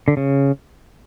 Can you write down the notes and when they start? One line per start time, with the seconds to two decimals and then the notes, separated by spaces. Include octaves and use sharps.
0.08 D3
0.17 C#3